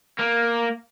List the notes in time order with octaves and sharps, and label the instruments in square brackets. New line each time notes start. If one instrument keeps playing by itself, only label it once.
[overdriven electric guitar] A#3